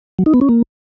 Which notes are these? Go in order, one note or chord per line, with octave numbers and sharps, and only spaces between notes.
F#3
D#4
B3
C#4
A#3